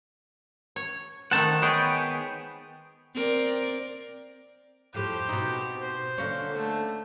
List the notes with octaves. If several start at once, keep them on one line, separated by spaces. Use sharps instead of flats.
C#5
D#3 A3 C4 F#5 A5
G#3 B3 G#4 B4 C#5 G5
C4 A#4 D5
F2 A2 G4 C5
B2 C4 D#4
C5
D3 A#3 C#4
A3